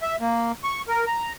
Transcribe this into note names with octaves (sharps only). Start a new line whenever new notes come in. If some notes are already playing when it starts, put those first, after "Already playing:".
E5
A#3
C#6
A#4
A#5